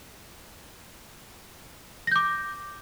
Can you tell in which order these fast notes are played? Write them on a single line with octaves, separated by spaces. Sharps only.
A#6 G6 D6